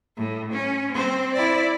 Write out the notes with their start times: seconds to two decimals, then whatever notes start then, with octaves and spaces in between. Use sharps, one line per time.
0.16 A2
0.52 C#4
0.92 C4 C5
1.33 E4 D5